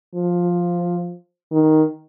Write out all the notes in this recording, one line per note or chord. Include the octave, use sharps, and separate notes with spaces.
F3
D#3